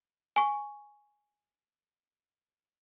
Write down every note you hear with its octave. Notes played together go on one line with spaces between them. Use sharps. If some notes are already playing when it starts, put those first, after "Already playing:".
G#5 C#6